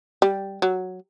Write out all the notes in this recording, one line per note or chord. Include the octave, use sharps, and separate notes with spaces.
G3
F#3